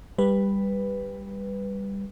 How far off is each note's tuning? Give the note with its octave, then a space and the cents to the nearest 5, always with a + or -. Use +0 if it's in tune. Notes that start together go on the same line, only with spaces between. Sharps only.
G3 +15 B4 +0